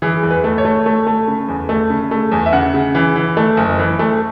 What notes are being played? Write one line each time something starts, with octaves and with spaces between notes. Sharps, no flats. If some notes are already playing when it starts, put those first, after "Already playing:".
E3 G#4
E2
B4
A3
C#5
A3
A3
A3
C#3
E2
A3
C#3
A3
E2
E5
C#3 F#5
C#3
E3
E3
A3
F#1
E3
A3